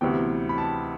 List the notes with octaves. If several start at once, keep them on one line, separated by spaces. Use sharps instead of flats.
D2 C3 E3 B3 G5
B5
A5